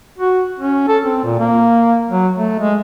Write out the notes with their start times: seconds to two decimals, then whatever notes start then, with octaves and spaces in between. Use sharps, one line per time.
0.18 F#4
0.59 C#4
0.88 A4
1.04 C4
1.24 A#2
1.39 A#3
2.09 F#3
2.37 A3
2.59 G#3